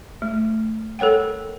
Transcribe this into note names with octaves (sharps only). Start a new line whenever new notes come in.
A3
A4 A#4 C#5 F#5 G5